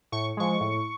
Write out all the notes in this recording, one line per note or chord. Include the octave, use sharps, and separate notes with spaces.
A2 C#6
F3 G#3 C#6
A2